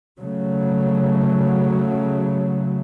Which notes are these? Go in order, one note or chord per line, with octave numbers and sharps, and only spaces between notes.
C#3 F#3 A3